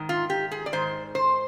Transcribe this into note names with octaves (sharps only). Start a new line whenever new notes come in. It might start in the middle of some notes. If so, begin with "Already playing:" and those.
Already playing: G#2 D#3
F4
G4
G#4
D5
G#2 D#3 C5
C5